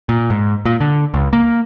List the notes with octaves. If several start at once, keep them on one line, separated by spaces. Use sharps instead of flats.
A#2
G#2
A#2
D3
C#2
A#3